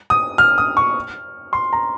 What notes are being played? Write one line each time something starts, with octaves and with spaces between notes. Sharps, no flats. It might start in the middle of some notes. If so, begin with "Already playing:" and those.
D#6
F6
D#6
C#6
C6
A#5